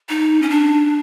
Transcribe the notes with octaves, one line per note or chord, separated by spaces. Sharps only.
D#4
C#4
D4